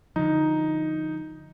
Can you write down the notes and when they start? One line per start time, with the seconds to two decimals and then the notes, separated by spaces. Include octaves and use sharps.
0.16 D3 F3 D#4